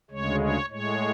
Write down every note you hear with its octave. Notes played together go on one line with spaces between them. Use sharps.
D2 C#3 G#3 C#5
C#5
A2 G#3 C#5